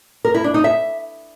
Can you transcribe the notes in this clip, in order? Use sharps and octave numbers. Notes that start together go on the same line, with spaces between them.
A#4
E4
D4
D#4
E5